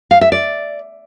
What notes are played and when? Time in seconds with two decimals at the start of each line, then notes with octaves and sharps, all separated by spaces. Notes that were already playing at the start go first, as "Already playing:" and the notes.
0.11 F5
0.21 E5
0.32 D5